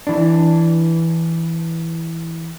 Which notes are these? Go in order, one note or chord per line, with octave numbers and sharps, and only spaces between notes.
E3 D4